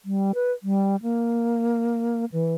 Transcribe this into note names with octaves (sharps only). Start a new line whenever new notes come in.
G3
B4
G3
A#3
E3